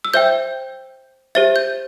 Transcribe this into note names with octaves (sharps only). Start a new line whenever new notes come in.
E6
C5 E5 G5 G6
G4 C5 E5 A6
G6